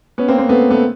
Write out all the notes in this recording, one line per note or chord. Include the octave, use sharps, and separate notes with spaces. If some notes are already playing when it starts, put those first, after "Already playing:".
B3 C#4
A#3 C4
A#3 C4
A3 B3
A3 B3